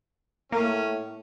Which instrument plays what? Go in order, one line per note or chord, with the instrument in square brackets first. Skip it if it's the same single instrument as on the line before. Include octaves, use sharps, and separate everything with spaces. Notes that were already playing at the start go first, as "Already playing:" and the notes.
[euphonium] A2 [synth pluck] A#3 [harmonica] C#4